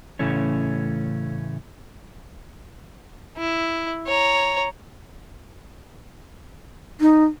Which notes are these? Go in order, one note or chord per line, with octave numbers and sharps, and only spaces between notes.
A2 C#3 E3 A3 C#4
E4
C#5 A#5
D#4